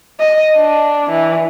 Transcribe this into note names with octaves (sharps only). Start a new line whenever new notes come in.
D#5
D4
E3